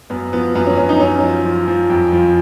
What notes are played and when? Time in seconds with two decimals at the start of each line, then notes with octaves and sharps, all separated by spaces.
0.10 F#2 B3
0.33 F3 B3
0.55 F#2 B3
0.66 C#4
0.77 F#2 C#4
0.89 D#4
1.00 F#2 C#4
1.23 F3
1.45 F3
1.68 F3
1.90 F2
2.12 F3